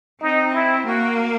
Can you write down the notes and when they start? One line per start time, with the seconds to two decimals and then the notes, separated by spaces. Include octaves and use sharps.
0.22 C4 D#4
0.54 E4
0.85 A#3 F#4